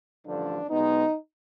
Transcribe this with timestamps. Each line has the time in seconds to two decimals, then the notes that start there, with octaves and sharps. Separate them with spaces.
0.25 A1 G2 D3 F3 D4
0.69 B1 B2 G#3 B3 D#4